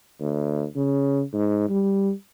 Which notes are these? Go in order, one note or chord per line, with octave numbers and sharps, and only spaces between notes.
D2
C#3
G#2
G3